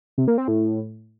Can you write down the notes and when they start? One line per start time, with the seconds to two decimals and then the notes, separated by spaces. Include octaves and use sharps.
0.18 C3
0.28 A#3
0.38 C4
0.48 A2